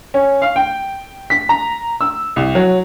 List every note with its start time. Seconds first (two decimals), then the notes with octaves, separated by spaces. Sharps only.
0.14 C#4
0.42 F5
0.56 G5
1.30 B6
1.49 A#5
2.01 E6
2.36 C2
2.55 F#3